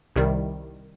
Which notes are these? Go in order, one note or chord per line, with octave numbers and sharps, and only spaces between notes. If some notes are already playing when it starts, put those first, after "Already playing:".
C2 C3 D#3 G3